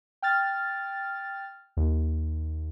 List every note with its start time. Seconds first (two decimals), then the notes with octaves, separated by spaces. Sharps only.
0.22 G5 F6 A6
1.77 D#2